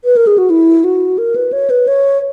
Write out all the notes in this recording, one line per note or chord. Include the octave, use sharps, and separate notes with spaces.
B4
A#4
G#4
F#4
E4
F#4
A#4
B4
C#5
B4
C#5